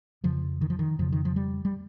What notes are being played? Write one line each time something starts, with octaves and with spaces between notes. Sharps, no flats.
F2 C#3 F3
D#3
F3
D#3
F2 C#3 F3
D#3
F3
G3
G3